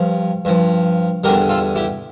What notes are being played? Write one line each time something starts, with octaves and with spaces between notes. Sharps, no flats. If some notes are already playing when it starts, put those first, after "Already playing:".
Already playing: G2 F3
G2 F3
E2 D3 G3 G4 A#4
F4 A4
E4 G4